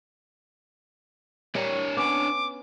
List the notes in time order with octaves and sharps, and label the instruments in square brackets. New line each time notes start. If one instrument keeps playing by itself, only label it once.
[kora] G3 A#4 [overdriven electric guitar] D4 C#5
[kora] B3 C#4 [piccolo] D6